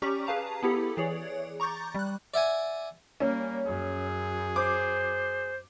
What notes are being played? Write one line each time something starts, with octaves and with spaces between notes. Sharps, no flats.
C#4 G4 D5 A#5 C#6 B6
G#4 B4 F5 A5 A#5
B3 E4 G4 A4
E3 G#4 C#5 D5
A#5 C#6 D6 G6 A6
G3 F#6
D5 E5 F#5 G#5
G3 A#3 C#4
F#2 G#4
C5 D6